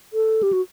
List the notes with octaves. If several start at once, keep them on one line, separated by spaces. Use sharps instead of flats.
A4
G4
F#4